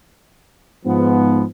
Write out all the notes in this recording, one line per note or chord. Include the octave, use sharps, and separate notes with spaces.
G#2 F3 B3